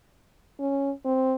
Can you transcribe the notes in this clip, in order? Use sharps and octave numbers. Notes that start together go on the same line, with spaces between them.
C#4
C4